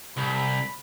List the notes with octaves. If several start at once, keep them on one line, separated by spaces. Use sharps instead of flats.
C2 B5